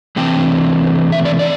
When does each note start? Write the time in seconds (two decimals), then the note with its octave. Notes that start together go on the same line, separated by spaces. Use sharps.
0.16 C3 E3 A3 C4 G5
1.12 E5
1.25 D5
1.39 D5